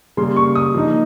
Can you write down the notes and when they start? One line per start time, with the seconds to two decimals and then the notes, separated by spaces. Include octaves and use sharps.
0.17 C#3 G3 A#3 C6
0.36 C#6
0.55 D#6
0.75 F3 A#3 D#4